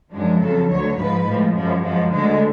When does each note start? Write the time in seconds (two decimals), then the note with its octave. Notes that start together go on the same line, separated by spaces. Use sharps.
0.11 F#2 F3 G#3 D4
0.40 F2 C#3 F#3 A4
0.68 D2 D3 F#3 C#5
0.96 G#2 F3 G#3 B4
1.25 A2 F3 G#3
1.53 F#2 F3 G#3
1.82 F#2 F3 G#3
2.10 D2 D3 G#3